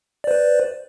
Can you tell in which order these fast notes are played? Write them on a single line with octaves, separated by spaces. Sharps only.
D5 C5 B4